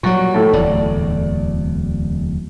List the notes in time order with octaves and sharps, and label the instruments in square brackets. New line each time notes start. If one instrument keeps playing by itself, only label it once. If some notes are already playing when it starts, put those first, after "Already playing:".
[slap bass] A#2 G3 [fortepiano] F#3 C#6
[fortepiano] A2 A3
[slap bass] D1 E2 [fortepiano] D5